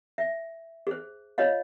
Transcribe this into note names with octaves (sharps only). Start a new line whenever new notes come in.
E5
G#4 C5
F4 C#5 D#5 F5